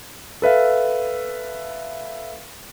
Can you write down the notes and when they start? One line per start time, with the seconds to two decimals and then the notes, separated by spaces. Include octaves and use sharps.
0.42 A4 B4 E5 F5